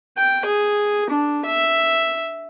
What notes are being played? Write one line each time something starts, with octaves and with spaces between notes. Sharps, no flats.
G5
G#4
D4
E5